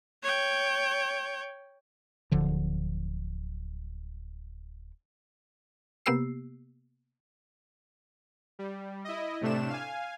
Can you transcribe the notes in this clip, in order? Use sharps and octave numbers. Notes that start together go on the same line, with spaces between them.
C#5 G5
D1 D3 F3
C3 A#3 B3 G4 E6 C7
G3
E4 D#5
A2 C3 A3 D4 E7
F5 G#5